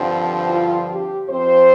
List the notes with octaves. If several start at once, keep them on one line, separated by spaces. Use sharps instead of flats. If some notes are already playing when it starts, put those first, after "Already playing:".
Already playing: G2 D3 F3 C4
F4
G4
F2 F3 C4 C5